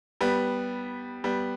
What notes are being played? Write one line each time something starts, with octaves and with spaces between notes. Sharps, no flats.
G3 B3
G3 B3